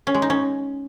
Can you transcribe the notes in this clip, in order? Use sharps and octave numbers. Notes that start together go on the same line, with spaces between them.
C#4
G#3
D#4
C#4